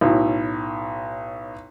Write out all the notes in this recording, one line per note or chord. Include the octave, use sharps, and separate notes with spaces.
B1 A2